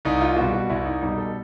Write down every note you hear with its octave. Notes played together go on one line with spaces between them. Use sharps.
C2 D#4
F4
B2 G3 F#4
F#4
C2 E4
D#4
B2 G3 D#4
A4